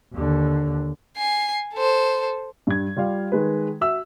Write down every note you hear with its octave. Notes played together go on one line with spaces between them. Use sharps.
D#2 D3
G#5 C7
A4 C5
G2 G#6
G3 F4 D5 F5
D#3 G#3 B4
F#4 E5 E6